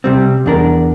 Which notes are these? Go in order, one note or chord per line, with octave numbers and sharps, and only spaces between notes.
C3 G3 C4
E2 D4 A#4